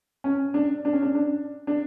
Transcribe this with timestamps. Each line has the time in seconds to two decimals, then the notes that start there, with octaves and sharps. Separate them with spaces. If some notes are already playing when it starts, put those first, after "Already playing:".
0.24 C#4
0.54 D4
0.85 D4
0.93 C#4
1.02 D4
1.15 D4
1.67 D4